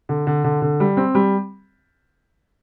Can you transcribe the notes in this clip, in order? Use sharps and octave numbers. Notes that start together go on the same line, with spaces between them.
D3
D3
D3
D3
G3
C4
G3